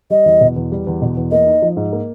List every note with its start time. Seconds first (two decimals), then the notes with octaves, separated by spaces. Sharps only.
0.10 G3 D#5
0.25 E2
0.41 B2
0.56 E2
0.72 G3
0.87 E2
1.02 B2
1.17 E2
1.31 A#3 D#5
1.46 D#4
1.62 F3
1.77 G#2
1.93 A#3